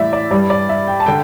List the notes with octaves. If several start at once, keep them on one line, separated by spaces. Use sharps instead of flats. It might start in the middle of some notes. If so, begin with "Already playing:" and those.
Already playing: A2 E3 G3 D5 E5
D5
G2 G3 D5
D5
E5
G5
A5
D3 G5